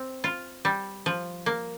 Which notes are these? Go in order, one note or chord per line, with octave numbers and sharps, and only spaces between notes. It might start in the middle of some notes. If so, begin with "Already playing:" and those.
Already playing: C4
F4
G3
F3
A#3